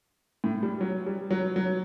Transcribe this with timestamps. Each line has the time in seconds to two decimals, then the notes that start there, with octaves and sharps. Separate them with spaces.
0.44 A2
0.63 G3
0.81 F#3
1.07 G3
1.31 F#3
1.56 F#3